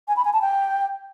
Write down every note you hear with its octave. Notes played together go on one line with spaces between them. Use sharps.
G#5
B5
G#5
A5
G5